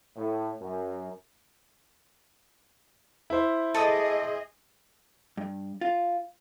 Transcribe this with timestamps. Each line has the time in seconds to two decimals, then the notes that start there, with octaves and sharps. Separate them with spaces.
0.15 A2
0.60 F#2
3.30 E4 C5
3.74 G#4 A4 D5 D#5 D#6
5.37 G2
5.81 F4